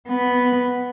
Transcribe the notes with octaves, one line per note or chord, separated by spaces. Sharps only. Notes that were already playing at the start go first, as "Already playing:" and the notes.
B3